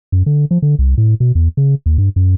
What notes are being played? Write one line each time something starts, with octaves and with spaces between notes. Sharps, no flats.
F#2
D3
F3
D3
C2
A2
B2
E2
C#3
D#2
G2
F#2